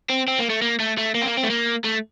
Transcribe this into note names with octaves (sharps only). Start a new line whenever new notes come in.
C4
C4
A#3
A3
A#3
A3
A3
A#3
C4
A#3
C4
A3
A#3
A3